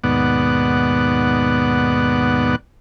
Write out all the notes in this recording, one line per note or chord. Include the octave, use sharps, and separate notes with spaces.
D#2 G#2 B2 B3 D5 F#5